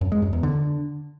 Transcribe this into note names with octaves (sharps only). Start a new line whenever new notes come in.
F#2
G#3
F#2
E2
D3